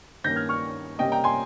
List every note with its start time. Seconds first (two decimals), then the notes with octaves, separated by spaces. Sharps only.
0.24 G2 D#3 A#3 C#4 G6 A#6
0.36 F6 G#6
0.49 C#6 F6
0.99 C3 G3 A#3 C#4 D#5 G5
1.12 G5 A#5
1.24 G#5 C6